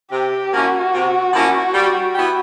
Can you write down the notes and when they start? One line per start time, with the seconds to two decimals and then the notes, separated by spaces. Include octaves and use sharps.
0.12 C3 G4
0.52 F3 A#3 C#4 E4 F#4
0.94 C3
1.33 F3 A#3 C#4 E4
1.74 G3
2.15 B3 E4 G4